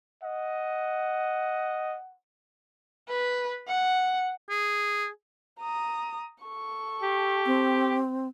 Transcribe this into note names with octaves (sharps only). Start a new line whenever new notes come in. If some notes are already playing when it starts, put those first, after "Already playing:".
D#5 F#5
B4
F#5
G#4
A#5 D#6
A4 C#6
G4
C4